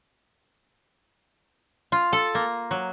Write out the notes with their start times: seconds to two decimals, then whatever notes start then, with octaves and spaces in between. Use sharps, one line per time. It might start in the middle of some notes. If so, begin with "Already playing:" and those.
1.92 F4
2.13 A4
2.35 A#3
2.71 F#3